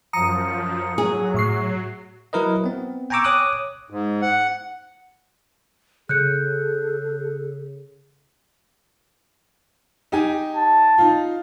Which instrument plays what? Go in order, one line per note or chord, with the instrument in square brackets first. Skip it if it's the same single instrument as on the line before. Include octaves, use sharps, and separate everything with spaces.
[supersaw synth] F#2 F3 [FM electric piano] A#5 D#6 C#7
[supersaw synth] F#3 [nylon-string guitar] G#4
[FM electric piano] A2 C#6 C7
[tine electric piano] F#3 E4 A#4 B4 D#5
B3 C4
G5 G#5 A#5 C#6 D6 E6
C#5 D6 D#6 F#6
[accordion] G#2
F#5
[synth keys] C#3 [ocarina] G#4 [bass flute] A4 [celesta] F#6 G6 C#7
[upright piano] D#4 G4 G#5
[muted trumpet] A5
[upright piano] D#4 F4